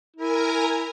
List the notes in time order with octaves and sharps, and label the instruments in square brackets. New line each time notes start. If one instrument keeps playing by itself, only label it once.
[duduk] E4 [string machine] A#4 G#5 A#5